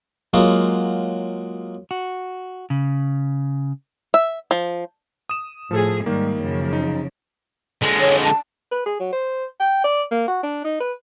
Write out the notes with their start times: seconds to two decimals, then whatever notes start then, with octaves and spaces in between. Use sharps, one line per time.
0.33 F#3 G#3 A#3 F4 F#4 G#4
1.91 F#4
2.70 C#3
4.14 E5
4.51 F3
5.29 D#6 E7
5.71 A2 F3 G#4 A4
6.06 G#2 D#3 G3 A#3
6.41 F#2 C#3 F3
6.73 D#4
7.82 D3 G#3
8.00 C#5
8.24 A5
8.72 B4
8.86 G#4
9.00 F#3
9.13 C5
9.60 G5
9.84 D5
10.12 A#3
10.28 F#4
10.43 D4
10.65 D#4
10.80 B4